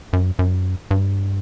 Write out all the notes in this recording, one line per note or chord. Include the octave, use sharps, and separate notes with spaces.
F#2
F#2
G2